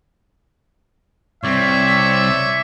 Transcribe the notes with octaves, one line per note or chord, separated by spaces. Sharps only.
C2 C4 C#5 D5 E5 C#6